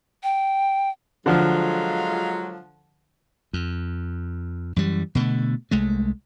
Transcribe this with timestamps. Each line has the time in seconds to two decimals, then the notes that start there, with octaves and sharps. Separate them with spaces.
0.23 G5
1.26 D3 F3 F#3 G#3 F4
3.53 F2
4.76 F#2 E3 G3
5.15 B2 D3 G#3 A3
5.71 C2 G#3 A3